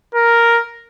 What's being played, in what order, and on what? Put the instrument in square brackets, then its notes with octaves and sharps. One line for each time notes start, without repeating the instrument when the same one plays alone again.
[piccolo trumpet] A#4